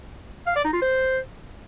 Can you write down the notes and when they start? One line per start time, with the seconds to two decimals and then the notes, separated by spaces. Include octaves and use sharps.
0.47 F5
0.56 D5
0.64 D#4
0.73 F4
0.82 C5